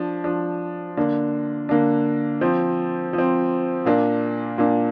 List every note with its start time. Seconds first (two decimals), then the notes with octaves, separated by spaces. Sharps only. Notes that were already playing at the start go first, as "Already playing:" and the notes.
Already playing: F3 D4
0.24 F3 D4
0.97 D3 A#3 D4
1.69 D3 A#3 D4
2.41 F3 C4
3.13 F3
3.18 C4
3.85 A#2 A#3 D4
4.58 A#2 A#3 D4